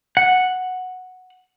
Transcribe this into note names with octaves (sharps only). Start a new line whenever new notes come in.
F#5